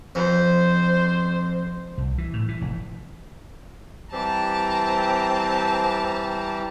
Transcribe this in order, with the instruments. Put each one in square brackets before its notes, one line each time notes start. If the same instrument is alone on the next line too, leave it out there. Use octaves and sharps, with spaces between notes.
[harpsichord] F2 [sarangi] C5
[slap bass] C2
E3
A2
E3
F1
[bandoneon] E3 G3 G4 [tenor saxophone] C4 [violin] A5 A#5